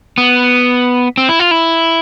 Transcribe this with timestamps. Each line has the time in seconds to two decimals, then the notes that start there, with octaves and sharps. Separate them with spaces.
0.18 B3
1.17 C4
1.29 E4
1.39 F4
1.51 E4